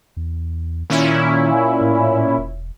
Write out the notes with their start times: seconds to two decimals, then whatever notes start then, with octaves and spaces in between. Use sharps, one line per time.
0.17 E2
0.90 A#2 D#3 C#4 E4
1.81 A2
2.38 E1